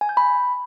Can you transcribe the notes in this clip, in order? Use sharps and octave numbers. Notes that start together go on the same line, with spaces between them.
G#5
G6
B5